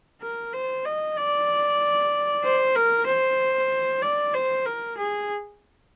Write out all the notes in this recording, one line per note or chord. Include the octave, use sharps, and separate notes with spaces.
A#4
C5
D#5
D5
C5
A#4
C5
D5
C5
A#4
G#4